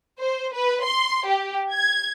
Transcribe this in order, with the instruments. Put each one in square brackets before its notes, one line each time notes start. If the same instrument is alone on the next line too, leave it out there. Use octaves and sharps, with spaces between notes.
[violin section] C5
B4
C6
G4
G#6